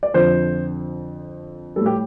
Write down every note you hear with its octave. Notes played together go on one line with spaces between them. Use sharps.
D5
F2 D3 F3 C5
A2 G3 A4
G4